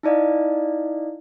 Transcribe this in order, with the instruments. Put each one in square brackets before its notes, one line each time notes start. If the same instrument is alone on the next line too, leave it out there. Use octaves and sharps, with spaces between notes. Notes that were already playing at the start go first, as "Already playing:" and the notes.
[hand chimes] D#4 E4 D5 D#5 F5